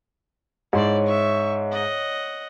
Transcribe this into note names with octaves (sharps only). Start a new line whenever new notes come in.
G#2 E4 C#5 D5 C6
E5 C#6
D#5 F#5